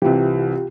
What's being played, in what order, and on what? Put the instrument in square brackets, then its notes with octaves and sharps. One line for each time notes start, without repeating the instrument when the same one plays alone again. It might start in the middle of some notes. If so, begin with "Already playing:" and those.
[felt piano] C2 C3 E3 [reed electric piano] F4 G4